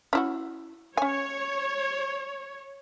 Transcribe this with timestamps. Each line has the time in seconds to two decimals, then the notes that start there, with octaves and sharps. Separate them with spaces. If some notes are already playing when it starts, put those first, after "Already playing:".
0.13 C#4 E4 F#4
0.97 C#4 C#5 G#5